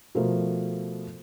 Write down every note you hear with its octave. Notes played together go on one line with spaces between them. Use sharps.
B2 F3 A3 A#4